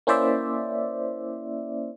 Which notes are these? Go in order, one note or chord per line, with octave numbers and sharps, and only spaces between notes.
A#3 C#4 E4 C5 D5 E5